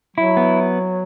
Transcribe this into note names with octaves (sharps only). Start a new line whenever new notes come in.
F#3 E4
B3